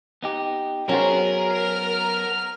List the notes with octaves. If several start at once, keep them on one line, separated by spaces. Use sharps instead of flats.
B3 D#4 G4
F#3 B3 C#4 F#4 G#4 A#4 C5
F6 F7